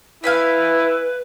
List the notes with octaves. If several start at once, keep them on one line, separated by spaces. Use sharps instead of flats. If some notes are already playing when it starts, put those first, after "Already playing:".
E4 B4 F5 G#5 B5